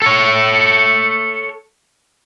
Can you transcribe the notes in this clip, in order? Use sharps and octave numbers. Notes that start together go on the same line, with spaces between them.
A4 C#5